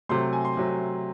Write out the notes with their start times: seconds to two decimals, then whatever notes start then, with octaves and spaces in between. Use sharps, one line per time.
0.09 C3 F#3 A3 C6
0.33 G#5
0.45 C6
0.57 C3 F#3 A3